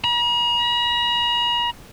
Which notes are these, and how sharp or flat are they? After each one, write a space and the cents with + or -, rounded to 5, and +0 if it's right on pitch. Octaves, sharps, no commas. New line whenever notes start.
A#5 +45